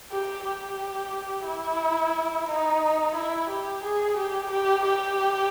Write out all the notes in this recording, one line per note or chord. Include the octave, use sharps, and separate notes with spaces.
G4
G4
E4
D#4
E4
G4
G#4
G4
G4
G4